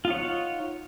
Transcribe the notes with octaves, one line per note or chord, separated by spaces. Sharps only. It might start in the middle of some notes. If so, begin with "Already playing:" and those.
D#4 F4 C#5 F#5